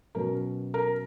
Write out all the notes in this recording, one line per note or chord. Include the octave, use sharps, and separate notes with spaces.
B2 F#3 C#4 A#4
A#4